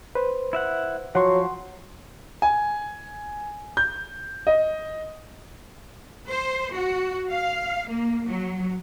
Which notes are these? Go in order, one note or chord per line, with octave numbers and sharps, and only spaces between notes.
B4 C5
E4 E5 F#5
F3 F#3 F#5 C6 C#6
G#5
G6
D#5
C5
F#4
F5
A#3
F#3